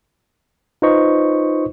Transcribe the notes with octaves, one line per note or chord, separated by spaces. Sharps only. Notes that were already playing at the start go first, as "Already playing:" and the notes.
D#4 F4 B4 C5 D#5 C#6